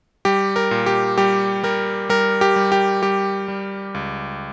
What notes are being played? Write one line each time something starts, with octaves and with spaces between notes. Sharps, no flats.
G3 G4
A#4
A#2
G4
G3 G4
G3 A#4
G3 A#4
G4
G3
G4
G3 G4
G3
C#2